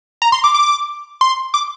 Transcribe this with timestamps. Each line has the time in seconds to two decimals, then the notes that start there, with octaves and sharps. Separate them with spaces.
0.22 A#5
0.32 C6
0.44 D6
0.54 D6
1.21 C6
1.54 D6